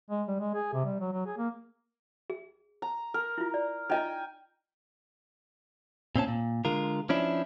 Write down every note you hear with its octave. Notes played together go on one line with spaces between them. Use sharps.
G#3
G3
G#3
G#4
C3
G3
F#3
F#3
G#4
A#3
G#4
A#5
A#4
E4 F4
D5
D#4 F4 D#5 G5 G#5 A#5
A#2 C4 C#4 A5
A#2
D3 G#3 F4 A#4
F3 C#4 D4 E4